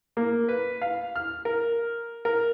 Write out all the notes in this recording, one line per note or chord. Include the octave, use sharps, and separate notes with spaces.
A#3
B4
F5
F6
A#4
A#4